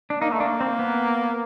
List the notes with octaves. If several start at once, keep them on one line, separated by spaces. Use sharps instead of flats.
D4
A#3 D#4
A3
A#3 D4
C4
B3